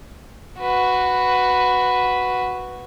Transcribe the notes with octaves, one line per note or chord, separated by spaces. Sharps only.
F#4 B4